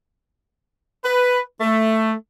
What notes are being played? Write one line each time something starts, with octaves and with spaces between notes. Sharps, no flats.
B4
A3